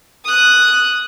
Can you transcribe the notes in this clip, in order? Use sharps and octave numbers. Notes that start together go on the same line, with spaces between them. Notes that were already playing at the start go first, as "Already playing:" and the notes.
D#6 F#6